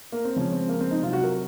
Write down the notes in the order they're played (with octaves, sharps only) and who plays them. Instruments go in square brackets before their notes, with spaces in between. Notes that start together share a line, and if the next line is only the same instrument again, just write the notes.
[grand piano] A#3
C4
C#3 F3 G#3 C#4
C4
A#3
C4
D#4
C3 F#3 F4
F#4
A#4